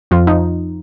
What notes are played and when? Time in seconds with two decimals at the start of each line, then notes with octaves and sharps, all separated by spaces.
0.11 F2 F3 F4
0.27 F3 D#4